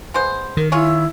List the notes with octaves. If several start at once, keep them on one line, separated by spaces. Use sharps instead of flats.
G#3 B3 C5
D#3 A#4
E4 F4 G#4 C#5